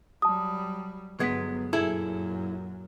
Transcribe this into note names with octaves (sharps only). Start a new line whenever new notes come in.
F#3 G3 A5 D#6
G1 F#3 G#3 B3 G#6 B6
F#2 A#2 E4 G#4 A4